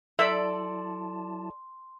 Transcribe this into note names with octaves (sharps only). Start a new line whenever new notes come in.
F#3 E4 A4 D5 E5 A5 C6